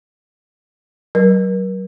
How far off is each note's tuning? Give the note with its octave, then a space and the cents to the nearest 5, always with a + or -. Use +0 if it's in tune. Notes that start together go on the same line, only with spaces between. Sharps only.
F#3 +30 A#4 +40